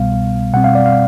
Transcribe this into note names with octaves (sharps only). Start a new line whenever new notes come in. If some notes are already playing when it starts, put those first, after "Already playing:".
Already playing: C2 B2 G3 B3 F5
B2 G3 C4 F#5
F5
D5
F5